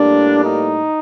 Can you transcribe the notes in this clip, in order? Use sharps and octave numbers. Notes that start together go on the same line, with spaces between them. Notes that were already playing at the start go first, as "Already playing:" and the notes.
Already playing: A2 G3 A#3 D4
D#4